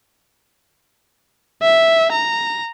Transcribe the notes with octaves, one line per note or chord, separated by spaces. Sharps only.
E5
A#5